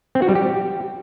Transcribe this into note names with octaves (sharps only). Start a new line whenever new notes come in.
C4
F#4
G3
G4